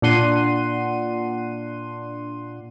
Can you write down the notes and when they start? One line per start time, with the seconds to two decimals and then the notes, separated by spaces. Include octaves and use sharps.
0.02 A#2 D4 F#5 C6 D#7